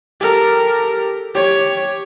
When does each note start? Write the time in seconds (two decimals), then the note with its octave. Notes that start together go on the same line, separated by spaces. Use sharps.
0.21 G4 A4 A#4
1.35 G4 C#5